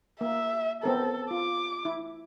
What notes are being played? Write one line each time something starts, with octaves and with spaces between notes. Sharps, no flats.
A#3 E5
B3 C4 A4 A#4
F4 D6
E4